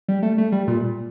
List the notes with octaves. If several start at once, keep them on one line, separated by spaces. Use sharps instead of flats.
G3
A3
A3
G3
A#2